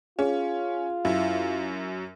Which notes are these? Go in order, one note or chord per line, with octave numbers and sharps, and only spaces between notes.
C#4 F4 G#4
F#2 E4